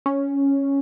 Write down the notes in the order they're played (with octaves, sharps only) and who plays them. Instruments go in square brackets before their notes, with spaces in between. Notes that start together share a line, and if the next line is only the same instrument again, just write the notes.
[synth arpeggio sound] C#4